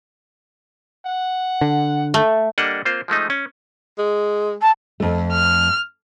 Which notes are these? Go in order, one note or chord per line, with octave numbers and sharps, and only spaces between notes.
F#5
D3
A3
G3 A#3 D4 A4 D#5 F#5
A#3 C4 F4 C5
F3 G#3 A3 D#4
C#4
G#3
A5
F2 A3
F6